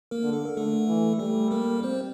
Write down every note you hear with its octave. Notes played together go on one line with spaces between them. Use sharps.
A#3 A#4
D3
A4
A#4
D3 A3 A4
E3
G3 A3 A4
A#3 A#4
C4 C5